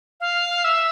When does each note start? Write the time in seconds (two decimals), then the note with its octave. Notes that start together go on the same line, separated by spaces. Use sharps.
0.20 F5
0.65 E5